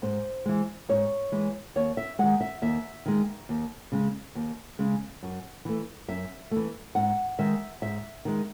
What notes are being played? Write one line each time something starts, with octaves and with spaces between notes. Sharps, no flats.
G#2 C5
E3 G#3
G#2 C#5
E3 G#3
D#2 C#5
E5
D#3 G#3 F#5
E5
D#2 E5
D#3 G#3
D#2
C#3 G#3
D#2
C#3 G#3
F#2
E3 A3
F#2 E5
E3 A3
G#2 F#5
D#3 G#3 E5
G#2 E5
D#3 G#3